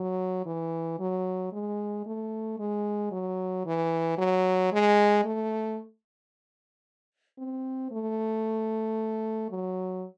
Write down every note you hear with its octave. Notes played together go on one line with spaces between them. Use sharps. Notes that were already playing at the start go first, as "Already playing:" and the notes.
Already playing: F#3
E3
F#3
G#3
A3
G#3
F#3
E3
F#3
G#3
A3
C4
A3
F#3